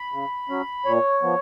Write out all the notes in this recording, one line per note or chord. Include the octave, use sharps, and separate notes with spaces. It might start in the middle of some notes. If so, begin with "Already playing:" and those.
Already playing: B5
C#3
F#3 C#4
A#2 C#5
F3 B3